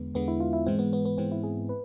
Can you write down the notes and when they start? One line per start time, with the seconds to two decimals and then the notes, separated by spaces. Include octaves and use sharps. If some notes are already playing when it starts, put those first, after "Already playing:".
Already playing: E2 D3 G#3 B3
0.14 E2 D3 G#3 B3
0.28 E4
0.40 F4
0.53 E4
0.66 G#2 E3 G#3 C4
0.79 B3
0.93 B3
1.05 B3
1.18 G#2 E3 G#3 C4
1.32 E4
1.43 G#4
1.69 B4